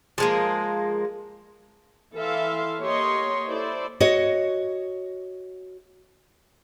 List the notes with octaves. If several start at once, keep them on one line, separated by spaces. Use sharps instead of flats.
F3 G#3 A#3
E3 A4 E5 F5 C6
A#3 G4 C#5 D#5 C6
E4 A4 C5 D5
F#4 C#5 D#5